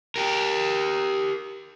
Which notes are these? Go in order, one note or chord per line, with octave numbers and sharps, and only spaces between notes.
G4 A#4